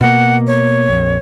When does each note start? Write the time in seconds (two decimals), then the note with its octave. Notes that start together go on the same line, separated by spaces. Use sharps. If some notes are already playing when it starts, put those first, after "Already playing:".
0.01 B2 A#3 F#5
0.47 C#5
0.88 A#1 F2